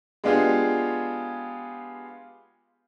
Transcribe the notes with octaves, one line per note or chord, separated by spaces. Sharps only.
G#3 B3 D4 F4 G4 G#4